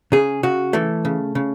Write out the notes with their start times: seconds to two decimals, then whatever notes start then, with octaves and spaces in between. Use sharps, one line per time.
0.12 C#3 G#4
0.43 C#3 F#4
0.73 E3 A3
1.05 C#3
1.35 C#3